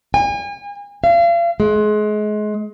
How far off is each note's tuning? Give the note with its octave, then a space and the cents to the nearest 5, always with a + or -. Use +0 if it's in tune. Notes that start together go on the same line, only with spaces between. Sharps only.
G#5 -40
F5 -35
G#3 +30